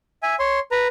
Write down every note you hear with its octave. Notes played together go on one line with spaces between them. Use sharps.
E5 G#5
C#5 C6
B4 A#5